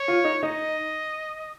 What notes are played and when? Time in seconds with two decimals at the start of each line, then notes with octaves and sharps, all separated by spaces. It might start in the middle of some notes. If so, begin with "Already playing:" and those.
Already playing: C#5
0.08 F4
0.24 D#4
0.43 D#4 D#5